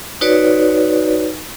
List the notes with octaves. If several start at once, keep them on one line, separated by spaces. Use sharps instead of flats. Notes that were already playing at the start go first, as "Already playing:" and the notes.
D#4 F#4 B4 C#5 D5